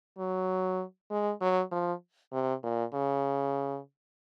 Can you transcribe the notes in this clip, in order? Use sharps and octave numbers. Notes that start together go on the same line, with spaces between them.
F#3
G#3
F#3
F3
C3
A#2
C#3